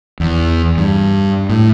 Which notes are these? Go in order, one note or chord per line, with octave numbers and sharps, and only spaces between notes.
E2
G2
A2